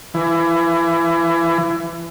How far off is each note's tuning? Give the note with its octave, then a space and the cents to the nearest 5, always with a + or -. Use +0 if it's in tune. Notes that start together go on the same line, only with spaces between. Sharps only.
E3 +25